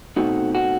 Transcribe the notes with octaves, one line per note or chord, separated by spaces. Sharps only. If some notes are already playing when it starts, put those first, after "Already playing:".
B2 A3 C4 D#4 F#4
F#4